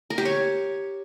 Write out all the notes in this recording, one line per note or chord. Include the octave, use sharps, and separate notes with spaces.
A#4
G4
C#5